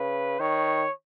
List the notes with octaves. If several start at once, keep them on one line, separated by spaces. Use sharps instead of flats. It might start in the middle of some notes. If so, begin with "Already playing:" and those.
Already playing: C#3 B4
D#3 C#5